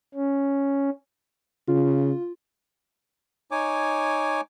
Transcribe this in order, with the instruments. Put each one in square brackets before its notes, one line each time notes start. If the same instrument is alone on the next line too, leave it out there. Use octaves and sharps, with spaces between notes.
[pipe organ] C#4
[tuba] C#3 [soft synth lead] F4
[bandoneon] D#4 C#5 G#5 D6